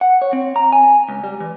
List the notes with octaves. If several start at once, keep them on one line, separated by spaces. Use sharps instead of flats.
F#5
C#5
C4
A#5
G#5
C#2
G3
E3